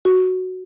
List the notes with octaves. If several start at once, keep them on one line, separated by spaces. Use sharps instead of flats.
F#4